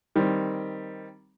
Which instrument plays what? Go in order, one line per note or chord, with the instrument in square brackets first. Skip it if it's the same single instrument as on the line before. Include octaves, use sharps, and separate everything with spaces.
[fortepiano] D#3 G3 C4